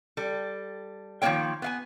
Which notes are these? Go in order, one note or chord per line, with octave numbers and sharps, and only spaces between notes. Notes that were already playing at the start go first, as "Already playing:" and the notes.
G3 A4
D#3 F3 F#3 A#3 C#5 G5
B3 F5 G#5